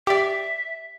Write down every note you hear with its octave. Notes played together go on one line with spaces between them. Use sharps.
G4 D5 E5